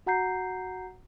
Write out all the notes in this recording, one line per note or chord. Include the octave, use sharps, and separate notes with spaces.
F#4 F#5 A#5 G6 C7